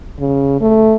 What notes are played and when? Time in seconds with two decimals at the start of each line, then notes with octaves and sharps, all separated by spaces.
0.20 C#3
0.61 A3